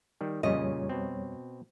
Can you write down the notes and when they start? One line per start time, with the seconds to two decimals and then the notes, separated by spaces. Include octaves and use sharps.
0.21 D#3 G3
0.43 F2 A#2 C#3 G3 C#4 C#5 D#5
0.89 B2 C4